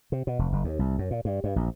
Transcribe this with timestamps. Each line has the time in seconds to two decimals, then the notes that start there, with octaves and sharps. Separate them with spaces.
0.12 C3
0.27 B2
0.39 F1
0.52 F#1
0.64 D#2
0.79 C2
0.99 F#2
1.11 A#2
1.25 G2
1.44 G2
1.56 A#1